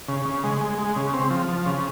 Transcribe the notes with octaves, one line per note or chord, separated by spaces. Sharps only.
C#3
C#3
G#3
G#3
G#3
C#3
C4
F3
F3
C#3